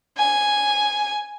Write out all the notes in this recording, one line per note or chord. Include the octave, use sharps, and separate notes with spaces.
G#5